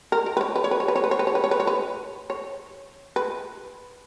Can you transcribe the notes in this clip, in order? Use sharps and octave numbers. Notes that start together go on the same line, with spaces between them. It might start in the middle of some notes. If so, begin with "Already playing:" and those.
A#4
A#4
B4
C#5
B4
C#5
B4
C#5
B4
C#5
B4
C#5
B4
C#5
B4
C#5
B4
C#5
B4
C#5
B4